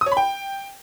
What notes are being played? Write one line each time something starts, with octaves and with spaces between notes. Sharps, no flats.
D#6
C#5
B5
G5